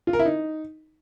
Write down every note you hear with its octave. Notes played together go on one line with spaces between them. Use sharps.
F4
A#4
E4
D#4